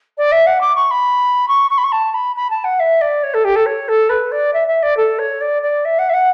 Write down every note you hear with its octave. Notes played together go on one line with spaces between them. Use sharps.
D5
E5
F#5
D6
C#6
B5
C#6
C#6
B5
C#6
A5
B5
B5
A5
F#5
E5
D5
C#5
A4
G4
A4
C#5
A4
B4
D5
E5
E5
D5
A4
C#5
D5
D5
E5
F#5
E5
F#5